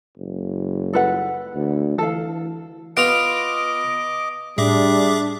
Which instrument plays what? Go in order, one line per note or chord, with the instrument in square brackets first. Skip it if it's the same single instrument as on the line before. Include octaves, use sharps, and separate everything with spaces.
[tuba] F#1
[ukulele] A4 B4 F#5
[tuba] D2
[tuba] E3 [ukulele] A4 F5
[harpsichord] B3 F4 [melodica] D#5 D6 [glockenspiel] D7 F7
[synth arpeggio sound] A2 [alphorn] G3 [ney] D4 [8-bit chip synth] G#4 E5 D6